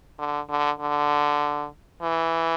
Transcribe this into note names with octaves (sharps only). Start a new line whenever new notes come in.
D3
D3
D3
E3